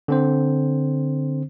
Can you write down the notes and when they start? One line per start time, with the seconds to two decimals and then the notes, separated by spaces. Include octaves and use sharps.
0.08 D3 C4 C5